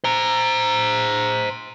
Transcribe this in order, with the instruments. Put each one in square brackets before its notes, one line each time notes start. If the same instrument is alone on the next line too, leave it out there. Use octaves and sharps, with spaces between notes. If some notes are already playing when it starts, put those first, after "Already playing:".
[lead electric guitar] C5 A#5